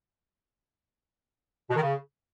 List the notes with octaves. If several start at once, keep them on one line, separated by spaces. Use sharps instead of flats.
B2
D#3
C#3